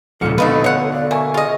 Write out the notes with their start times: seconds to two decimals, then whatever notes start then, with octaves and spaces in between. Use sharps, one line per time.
0.21 D#1 G#2 C#3 F3 A4 C#7
0.38 B2 D3 A3 D#4 B4 F5
0.64 C#5 F#5
0.93 D5 F5
1.11 A#3 A#4 E5 G#5 C#6
1.34 F4 G#4 D#5